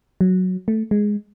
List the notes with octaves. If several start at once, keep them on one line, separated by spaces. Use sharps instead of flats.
F#3
A3
G#3